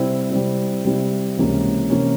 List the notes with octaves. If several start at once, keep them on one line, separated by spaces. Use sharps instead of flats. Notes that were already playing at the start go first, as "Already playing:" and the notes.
Already playing: C3 G3 C4 E4
C3 G3 C4 E4
C3 G3 C4 E4
C#2 C3 E3 A#3 C#4
C3 E3 A#3 C#4